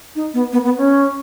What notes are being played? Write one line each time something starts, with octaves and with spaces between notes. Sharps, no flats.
D#4
B3
B3
B3
C#4